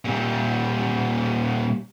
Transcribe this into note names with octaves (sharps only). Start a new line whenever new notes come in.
A#2 G3